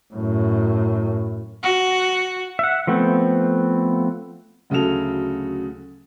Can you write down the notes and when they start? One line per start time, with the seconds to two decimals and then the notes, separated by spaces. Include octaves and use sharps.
0.14 F#2 A2
1.63 F#4
2.59 E5 F#5
2.87 F3 A3 B3 C4
4.70 D2 C#3 F#3 A4 F7